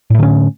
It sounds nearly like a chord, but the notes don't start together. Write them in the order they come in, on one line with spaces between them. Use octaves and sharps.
A2 A3 D3 C#4